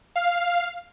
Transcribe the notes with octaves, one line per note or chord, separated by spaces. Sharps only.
F5